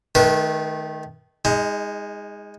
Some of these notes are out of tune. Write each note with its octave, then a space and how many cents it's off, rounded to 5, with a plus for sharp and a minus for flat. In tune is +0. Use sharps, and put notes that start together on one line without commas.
D#3 +0 A3 -25 B4 -35
G#3 -15 D#4 +25